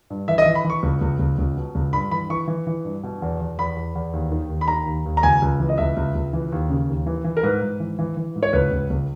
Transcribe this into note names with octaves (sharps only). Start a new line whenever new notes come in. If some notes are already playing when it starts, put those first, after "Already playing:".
G2
E3 E5
D#5
E5
E3
B5
E3
C#6
C#2
C#2
C#2
C#2
B2
C#2
G2 B5
E3 B5
E3 C#6
E3
E3
G2
B2
E2
E2
E2 B5
E2
E2
D#2
D#3
D#2
B5
D#3 A#5
D#2
D#2
A#5
C#2 G#5
C#2
E3
D#5
C#2 E5
C#2
C#2
E3
D#2
C#3
D#2
E3
E3
A#4
G#2 B4
G#2
E3
E3
E3
G#2
C#5
C#2 B4
C#2
C#2